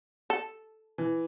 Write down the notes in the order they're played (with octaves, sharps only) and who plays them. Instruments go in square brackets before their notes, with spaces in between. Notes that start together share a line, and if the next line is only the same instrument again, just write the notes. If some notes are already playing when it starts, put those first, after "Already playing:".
[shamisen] A4
[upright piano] E3